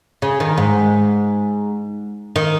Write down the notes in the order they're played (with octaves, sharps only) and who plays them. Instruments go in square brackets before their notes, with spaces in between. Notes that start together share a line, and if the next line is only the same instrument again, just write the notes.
[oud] C#3
D#3
G#2
D#3